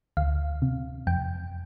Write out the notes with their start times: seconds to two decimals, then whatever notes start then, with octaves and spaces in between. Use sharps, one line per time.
0.17 D2 F5
0.62 C3
1.07 F2 G5